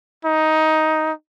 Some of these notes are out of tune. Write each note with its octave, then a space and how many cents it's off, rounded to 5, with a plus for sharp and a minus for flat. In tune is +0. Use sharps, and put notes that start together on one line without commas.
D#4 +10